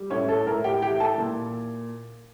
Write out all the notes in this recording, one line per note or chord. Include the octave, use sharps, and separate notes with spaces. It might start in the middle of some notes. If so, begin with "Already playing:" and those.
Already playing: G3
A2 C#4 C#5
A4
A2 A#4
G4 G5
E3 G4 G5
A4 A5
A#2